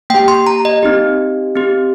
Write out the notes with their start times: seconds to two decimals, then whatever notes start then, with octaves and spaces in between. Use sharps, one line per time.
0.10 A#3 G4 G5
0.28 C6
0.47 A#5
0.65 D#5
0.83 C4 D#4 G4
1.56 C4 G4